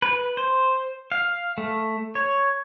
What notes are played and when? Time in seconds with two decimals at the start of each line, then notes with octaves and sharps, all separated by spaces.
0.02 B4
0.37 C5
1.12 F5
1.58 A3
2.15 C#5